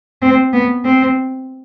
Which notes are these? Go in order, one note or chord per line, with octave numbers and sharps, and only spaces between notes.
C4
B3
C4